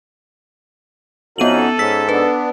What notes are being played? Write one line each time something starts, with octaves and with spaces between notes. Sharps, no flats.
F2 B3 C#4 D#4 F#4 A4 D#7 F#7
G#2 C#4 E6 B6
B3 D4 B4